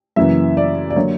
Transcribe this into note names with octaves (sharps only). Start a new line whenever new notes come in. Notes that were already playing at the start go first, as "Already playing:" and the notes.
F#2 C#3 E3 A#3 E5
D5
D5
D3 F#3 A#3 C#5